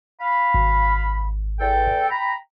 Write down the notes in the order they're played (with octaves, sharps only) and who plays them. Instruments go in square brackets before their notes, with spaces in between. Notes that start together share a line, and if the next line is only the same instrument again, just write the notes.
[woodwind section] F5 B5
[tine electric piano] G#1
[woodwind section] E2 A4 G5
G5 A#5 B5